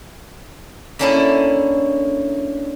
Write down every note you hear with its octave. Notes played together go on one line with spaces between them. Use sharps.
D3 A#3 C#4 D4 E4 A4